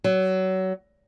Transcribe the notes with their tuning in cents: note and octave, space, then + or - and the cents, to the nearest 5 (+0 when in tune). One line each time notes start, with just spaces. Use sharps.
F#3 +25